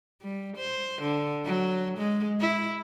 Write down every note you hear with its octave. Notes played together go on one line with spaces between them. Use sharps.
G3
C5
D3
F#3
G#3
E4